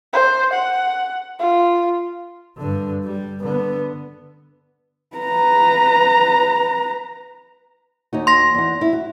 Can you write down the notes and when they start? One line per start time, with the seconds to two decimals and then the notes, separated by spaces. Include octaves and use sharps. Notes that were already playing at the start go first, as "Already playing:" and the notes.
0.13 C5
0.53 F#5
1.39 F4
2.57 G2 D3
3.04 G3
3.41 D3 B3
5.17 B4 A#5
8.13 D#2 D#4 F#4
8.27 C6 A#6
8.54 E2 F#5
8.81 E4
8.93 F#4